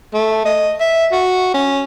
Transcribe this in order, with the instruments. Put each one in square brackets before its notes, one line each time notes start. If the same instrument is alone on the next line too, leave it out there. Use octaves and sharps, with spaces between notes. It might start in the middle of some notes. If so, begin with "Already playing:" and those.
[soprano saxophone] A3
D#5
E5
F#4
C#4